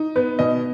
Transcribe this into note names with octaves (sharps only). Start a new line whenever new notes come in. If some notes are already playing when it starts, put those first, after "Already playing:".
Already playing: D#4
B3 B4
B2 D#5